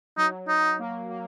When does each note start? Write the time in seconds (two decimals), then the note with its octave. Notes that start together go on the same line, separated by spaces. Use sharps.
0.17 F#3 D#4
0.48 F#3 D#4
0.79 A#3
1.09 A#3